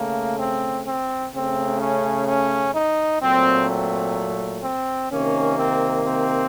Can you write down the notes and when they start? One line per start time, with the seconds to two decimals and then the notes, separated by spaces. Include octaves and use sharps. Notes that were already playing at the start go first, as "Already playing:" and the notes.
Already playing: C#3 A3 A#3
0.39 C4
0.87 C4
1.33 C#3 A3 C4
1.81 C#4
2.28 C#4
2.75 D#4
3.22 A#2 F#3 A3 C4
3.69 C4
4.63 C4
5.11 C3 D#3 A#3 C#4
5.59 C4
6.05 C4